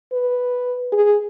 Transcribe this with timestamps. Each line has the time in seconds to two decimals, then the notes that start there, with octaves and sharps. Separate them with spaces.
0.13 B4
0.92 G#4